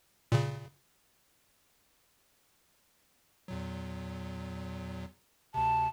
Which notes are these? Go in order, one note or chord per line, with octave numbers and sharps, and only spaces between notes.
A#2 C#3
E2 A#2 F#3
D2 C3 A5